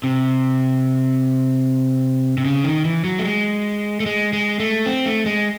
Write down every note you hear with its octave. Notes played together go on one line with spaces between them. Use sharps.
C3
C3
C#3
D#3
E3
F#3
A3
G#3
A3
G#3
G#3
A3
C4
A3
G#3